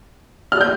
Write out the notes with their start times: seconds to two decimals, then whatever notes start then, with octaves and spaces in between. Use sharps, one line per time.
0.52 F6
0.61 G6